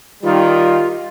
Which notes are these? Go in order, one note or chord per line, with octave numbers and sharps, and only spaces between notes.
D#3 G3 F4